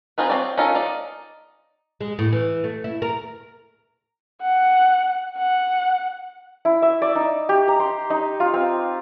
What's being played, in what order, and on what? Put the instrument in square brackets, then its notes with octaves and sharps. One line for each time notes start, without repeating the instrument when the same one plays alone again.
[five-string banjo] C4 D#4 F4 G#4 B4
C4 C#4 C#5 D5
C#4 D#4 F4 A4 A#4
D#4 D5
[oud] G#3
A2
E3
A3
E4
A#4
[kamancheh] F#5
F#5
[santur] E4
E5
D5
D#4
G4
A#5
C6
D#4
F4
C4